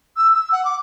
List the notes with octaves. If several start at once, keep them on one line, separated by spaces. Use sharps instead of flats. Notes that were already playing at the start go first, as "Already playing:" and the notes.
E6
E6
F#5
D6